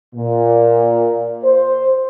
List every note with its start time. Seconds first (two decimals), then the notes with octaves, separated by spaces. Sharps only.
0.15 A#2
1.44 C5